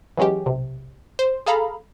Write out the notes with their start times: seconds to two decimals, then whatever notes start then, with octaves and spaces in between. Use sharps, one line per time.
0.17 E3 F#3 G#3 C#4 G4
0.46 B1 C3
1.19 C5
1.46 G#4 A4 F5 A#5 B5